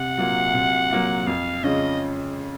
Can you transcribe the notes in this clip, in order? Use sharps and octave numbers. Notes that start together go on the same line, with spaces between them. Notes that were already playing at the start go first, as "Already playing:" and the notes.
Already playing: C3 F#5
F#3 A#3 F4
C3
F#3 A#3 F4
F2 F5
C#3 G#3 C#4 F4 D#5